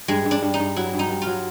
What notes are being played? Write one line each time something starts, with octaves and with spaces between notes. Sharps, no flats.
G2 G#3
G2
D4
G2
D#4
G2
F#3 E4
G2
D#4
G2
F4
F#3